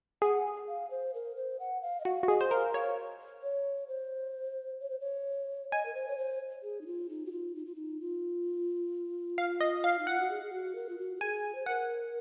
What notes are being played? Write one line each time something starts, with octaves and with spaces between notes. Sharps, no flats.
G#4 F#5
F5
C5
A#4
C5
F#5
F5
D#5
F#4 F5
F#4
G#4 D#5
C5
A#4 F5
C#5 F5
C#5
C5
C#5
C5
C#5
D#5 G#5
A#4
C5
C#5
C5
G#4
D#4
F4
D#4
F#4
F4
D#4
F4
D#4
F4
F5
D#5
F5
D#4
F4 F#5
F#4
G#4
G#4
F#4
A#4
F4
F#4
F#4
G#4 G#5
C5
A#4 F#5